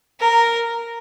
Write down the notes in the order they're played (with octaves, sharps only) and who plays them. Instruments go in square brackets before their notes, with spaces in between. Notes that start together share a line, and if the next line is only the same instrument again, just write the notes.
[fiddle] A#4